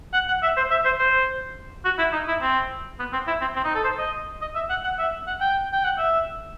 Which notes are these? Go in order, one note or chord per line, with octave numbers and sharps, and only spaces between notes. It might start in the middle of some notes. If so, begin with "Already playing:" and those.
F#5
F#5
E5
C5
E5
C5
C5
F#4
E4
D#4
E4
C4
B3
C4
E4
C4
C4
D#4
A4
C5
D#5
D#5
E5
F#5
F#5
E5
F#5
G5
G5
F#5
E5